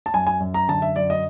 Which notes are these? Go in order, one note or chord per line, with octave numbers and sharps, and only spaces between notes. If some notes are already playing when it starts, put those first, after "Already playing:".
A5
F#2 G#5
G#5
F#2
A#5
D3 A5
E5
F#2 D5
D#5